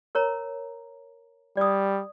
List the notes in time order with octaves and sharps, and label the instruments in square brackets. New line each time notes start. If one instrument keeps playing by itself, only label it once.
[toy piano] A#4 C#5 A#5
[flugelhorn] G3 [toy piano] D5 D#6